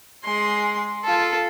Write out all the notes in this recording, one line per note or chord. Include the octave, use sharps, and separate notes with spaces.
G#3 C6
F4 A4